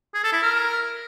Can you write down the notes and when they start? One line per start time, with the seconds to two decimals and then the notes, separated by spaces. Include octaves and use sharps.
0.14 G#4
0.24 A4
0.33 E4
0.42 A#4